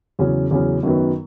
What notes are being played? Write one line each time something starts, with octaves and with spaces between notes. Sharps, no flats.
E2 C#3 F#3 C#4
E2 C#3 F#3 C#4
F#2 D#3 F#3 B3